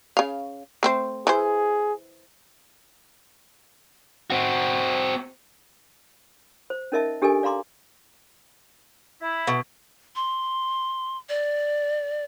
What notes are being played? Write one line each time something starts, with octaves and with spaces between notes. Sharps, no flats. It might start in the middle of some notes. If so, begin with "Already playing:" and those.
C#3 F5
A3 C4 C5
E3 G#4 C5
C4 F#4
C5
C#4 D#4 A#4 D#5 E5 A5
D4 G4 A4 A#4 D#5 G#5
D5 F5 A#5 C6 D6
E4
B2
C6
D5